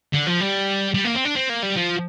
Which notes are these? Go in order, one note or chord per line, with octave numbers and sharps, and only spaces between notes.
D3
F3
G3
G3
A#3
C4
D4
C4
A#3
G3
F3